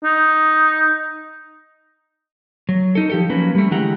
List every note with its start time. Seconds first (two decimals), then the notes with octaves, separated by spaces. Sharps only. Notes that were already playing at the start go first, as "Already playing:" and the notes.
0.04 D#4
2.69 F#3
2.95 D#4 A4
3.10 F3 G4 A4
3.29 F3 F#3 A#3 C#4 B4
3.55 G3 A3
3.71 D3 E3 G#3 G4 F#5 A#5